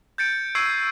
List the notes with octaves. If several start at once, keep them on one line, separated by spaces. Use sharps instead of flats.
G6 A6 C#7 D7
C#6 E6 G#6 C7 D7 D#7